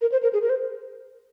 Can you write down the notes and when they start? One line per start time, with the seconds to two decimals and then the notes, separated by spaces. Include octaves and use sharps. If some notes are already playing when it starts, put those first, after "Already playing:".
0.01 A#4
0.12 C5
0.23 A#4
0.33 G#4
0.42 A#4
0.49 C5